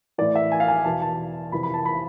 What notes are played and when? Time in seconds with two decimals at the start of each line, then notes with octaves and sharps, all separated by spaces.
0.18 A2 E3 D5
0.35 E5
0.52 G#5
0.60 F5
0.68 G#5
0.85 E2 B2 A5
1.02 A5
1.52 F2 C3 E3 B5
1.63 B5
1.74 A5
1.85 B5